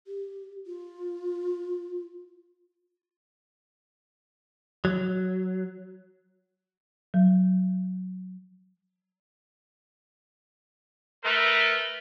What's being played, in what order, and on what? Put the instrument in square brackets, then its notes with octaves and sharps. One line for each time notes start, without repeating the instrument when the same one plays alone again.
[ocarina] G4
F4
[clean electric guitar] F#3
[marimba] F#3
[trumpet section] A3 A#4 B4